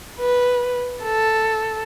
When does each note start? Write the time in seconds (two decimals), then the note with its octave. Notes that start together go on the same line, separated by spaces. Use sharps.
0.19 B4
1.04 A4